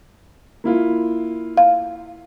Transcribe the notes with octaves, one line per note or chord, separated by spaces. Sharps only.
A#3 E4 F4
F5